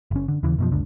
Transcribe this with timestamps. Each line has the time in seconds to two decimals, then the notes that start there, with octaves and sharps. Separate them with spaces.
0.11 F#1 C#4
0.28 D3
0.43 D#2 C#3 E3
0.58 F#2 B2 F3
0.71 F#1 C#2 D3